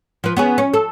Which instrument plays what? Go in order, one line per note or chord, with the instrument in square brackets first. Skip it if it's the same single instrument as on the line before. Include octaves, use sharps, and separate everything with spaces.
[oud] F3 B4
B3 C#4 G#4
C#4
A4